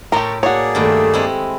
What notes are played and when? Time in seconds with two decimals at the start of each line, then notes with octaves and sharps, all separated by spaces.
0.12 A2 G4 A4 A#4 C6 C#6
0.43 A#3 F#4 G#4 C#5 D5
0.75 G2 D#3 A3
1.14 G#3 C4 E4